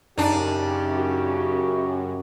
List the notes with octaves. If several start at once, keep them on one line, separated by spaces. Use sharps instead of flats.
F#2 C#3 D4 D#4 G4
F#4